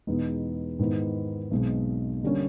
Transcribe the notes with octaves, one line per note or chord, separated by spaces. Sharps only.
E2 B2 G#3 B3 D#4
G#2 D#3 G#3 B3 E4
B1 B2 G#3 C4
D3 G3 A#3 C#4